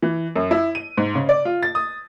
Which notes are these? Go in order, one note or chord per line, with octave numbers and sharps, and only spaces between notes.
E3
F#2
E4
D#7
G#2
C#3
D5
F4
A6
D#6